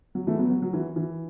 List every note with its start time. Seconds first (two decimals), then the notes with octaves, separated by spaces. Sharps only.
0.15 F#3
0.27 E3 A3
0.39 F#3 B3
0.50 F#3
0.62 F#3
0.73 E3
0.96 E3